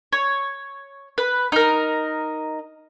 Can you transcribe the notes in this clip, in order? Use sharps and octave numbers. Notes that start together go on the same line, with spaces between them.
C#5
B4
D#4 A#4